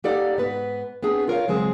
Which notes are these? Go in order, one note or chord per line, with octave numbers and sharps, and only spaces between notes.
A#3 D#4 G4 A4 D5 F#5
G#2 B3 B4
B3 C4 D4 G#4 B4
F4 A#4 C#5 F5
C#3 F#3 G#3 C4 G#4